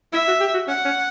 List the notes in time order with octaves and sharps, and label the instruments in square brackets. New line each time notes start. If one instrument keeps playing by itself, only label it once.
[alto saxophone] E4 [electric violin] E5
[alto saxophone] F#4
G4
F#4
[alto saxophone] C#4 [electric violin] F#5
[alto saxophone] C#4